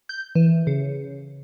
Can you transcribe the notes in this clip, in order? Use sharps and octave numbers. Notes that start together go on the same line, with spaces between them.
G6
E3
C#3